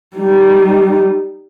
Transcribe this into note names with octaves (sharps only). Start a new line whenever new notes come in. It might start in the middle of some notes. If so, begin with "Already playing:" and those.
G3 D#4